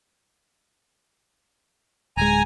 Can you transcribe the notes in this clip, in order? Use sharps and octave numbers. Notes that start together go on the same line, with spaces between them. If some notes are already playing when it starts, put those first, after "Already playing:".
D1 G#3 G#5 A#5